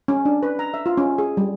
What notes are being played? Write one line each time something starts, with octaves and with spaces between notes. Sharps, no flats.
C#4
D4
B4
A#5
E5
F4
C#4
G#4
G3